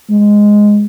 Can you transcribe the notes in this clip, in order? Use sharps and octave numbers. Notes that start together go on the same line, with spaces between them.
G#3